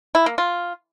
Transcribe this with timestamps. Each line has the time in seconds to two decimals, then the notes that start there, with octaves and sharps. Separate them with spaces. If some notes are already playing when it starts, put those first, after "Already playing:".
0.15 E4
0.26 A#3
0.38 F4